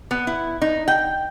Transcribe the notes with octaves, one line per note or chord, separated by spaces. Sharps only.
B3
E4
D#4
G5